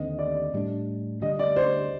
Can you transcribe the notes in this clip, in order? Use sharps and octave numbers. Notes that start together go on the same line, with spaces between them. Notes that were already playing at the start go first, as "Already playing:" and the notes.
Already playing: D#2 D3 C4 D#5
D5
A2 G3 D4
D2 D3 G3 D4 D#5
D5
C5